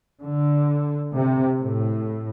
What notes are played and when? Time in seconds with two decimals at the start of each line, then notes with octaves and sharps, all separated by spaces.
0.21 D3
1.15 C3
1.59 A2